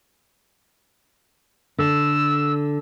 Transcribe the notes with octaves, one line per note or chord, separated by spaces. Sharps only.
D3 E6